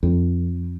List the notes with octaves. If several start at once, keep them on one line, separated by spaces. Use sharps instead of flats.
F2